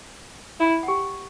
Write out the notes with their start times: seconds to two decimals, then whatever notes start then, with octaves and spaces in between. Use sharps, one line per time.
0.60 E4
0.83 F#5
0.88 G4 G5